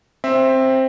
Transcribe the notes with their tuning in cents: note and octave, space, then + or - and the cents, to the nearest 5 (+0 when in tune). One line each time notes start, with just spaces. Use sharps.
C4 +10 E5 +0